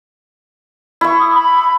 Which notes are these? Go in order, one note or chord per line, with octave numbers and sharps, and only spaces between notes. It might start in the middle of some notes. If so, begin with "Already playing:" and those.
E4 C#6
D#6
B5